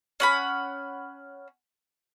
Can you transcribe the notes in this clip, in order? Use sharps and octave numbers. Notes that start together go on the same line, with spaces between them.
C#4 F#5 B5